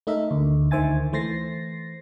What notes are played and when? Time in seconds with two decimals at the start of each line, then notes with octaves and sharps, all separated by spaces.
0.07 A3 D#4 A#4 E5
0.31 D2
0.71 D2 D#3 C5 E5 G#5 A6
1.13 E3 A3 C5 A6 A#6 C7